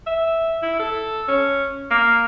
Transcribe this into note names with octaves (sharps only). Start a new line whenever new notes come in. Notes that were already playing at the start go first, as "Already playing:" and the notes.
E5
E4
A4
C#4
A#3